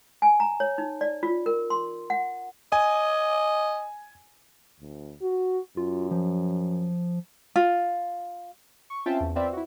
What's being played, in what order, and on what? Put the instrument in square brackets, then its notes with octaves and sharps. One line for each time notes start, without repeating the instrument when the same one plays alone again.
[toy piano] G#5
A#5
C#5
D#4
D5
F4
A#4
C6
F#5
[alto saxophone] D#5 [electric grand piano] G#5
[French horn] D2
F#4
[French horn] F#2 [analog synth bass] F4
[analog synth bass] F3
[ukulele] F4
[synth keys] C#6
C4 C#4 F4 E5 G5 A5
E2
C4 F4 B4 D5 E5
E4 F#4